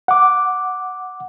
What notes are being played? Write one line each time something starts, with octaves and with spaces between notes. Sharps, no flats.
F#5 D6